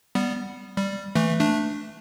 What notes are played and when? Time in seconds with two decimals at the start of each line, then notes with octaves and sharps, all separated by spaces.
0.15 G3 B3
0.77 G3
1.15 E3 A3
1.40 A3 D4